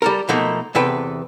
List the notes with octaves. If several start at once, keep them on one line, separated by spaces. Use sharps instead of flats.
G3 A4 A#4
B2 F3 A3 A#3 D#4
E2 C3 A4 B4 G5